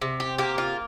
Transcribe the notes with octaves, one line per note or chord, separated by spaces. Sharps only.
C3
G4
A#3 G4
F4